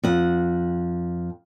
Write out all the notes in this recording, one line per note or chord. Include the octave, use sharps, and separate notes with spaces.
F2 F#5